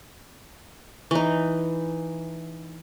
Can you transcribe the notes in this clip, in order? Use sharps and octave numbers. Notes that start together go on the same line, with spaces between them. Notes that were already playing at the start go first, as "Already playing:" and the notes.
E3 D#4